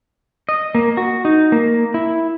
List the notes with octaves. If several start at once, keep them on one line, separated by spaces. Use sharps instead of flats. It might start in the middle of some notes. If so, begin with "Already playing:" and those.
D#5
A#3
F#4
D#4
A#3
E4